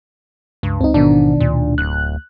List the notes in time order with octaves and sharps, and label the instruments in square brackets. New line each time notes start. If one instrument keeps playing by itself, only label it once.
[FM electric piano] C#2 [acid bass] G2
[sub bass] C#2 [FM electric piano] C4 D#4
[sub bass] A1 [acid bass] G#2 [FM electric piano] B2 D#3 D4
[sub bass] D2 [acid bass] A#2
[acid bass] D1 [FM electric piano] F#6